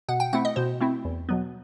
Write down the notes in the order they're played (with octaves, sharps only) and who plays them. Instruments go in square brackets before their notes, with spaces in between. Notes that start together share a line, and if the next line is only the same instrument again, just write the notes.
[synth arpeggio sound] B2 F#5
G5
A3 C4 E4 F#5
D#5
B2 C5
A3 C4 E4
E2
B2 F#3 B3